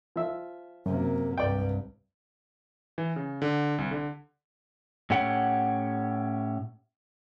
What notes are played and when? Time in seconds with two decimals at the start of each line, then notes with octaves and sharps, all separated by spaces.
0.16 F3 E5
0.86 F#2 C3 A#3 A#4
1.38 C2 G2 B4 D5 G5
2.98 E3
3.16 C#3
3.42 D3
3.78 C2
3.91 D3
5.10 A2 C#4 G4 F#5